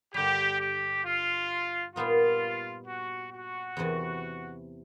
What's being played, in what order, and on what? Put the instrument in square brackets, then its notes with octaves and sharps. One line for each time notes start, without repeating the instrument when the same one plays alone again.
[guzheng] G2 D3 G3 [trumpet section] G4
[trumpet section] G4
F4
[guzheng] A#2 G3 B3 D#4 [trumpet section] F4
[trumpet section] F#4
F#4
[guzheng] E2 C3 E3